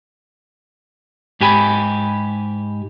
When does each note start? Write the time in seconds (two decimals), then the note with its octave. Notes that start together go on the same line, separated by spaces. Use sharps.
1.41 G#2 G4 G#5 B5